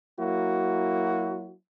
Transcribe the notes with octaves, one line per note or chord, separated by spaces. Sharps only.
F#3 A#3 E4 F#4